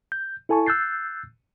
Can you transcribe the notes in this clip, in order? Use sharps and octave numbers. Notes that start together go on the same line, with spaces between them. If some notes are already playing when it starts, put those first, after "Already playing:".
G6
E4 A4 G#5 A5 C#6
E6 F#6 G6 A6 C7